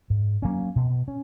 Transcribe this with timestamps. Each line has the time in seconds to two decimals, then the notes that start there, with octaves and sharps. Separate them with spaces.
0.10 G#2
0.42 F#3 A#3 C#4
0.76 B2
1.08 C#4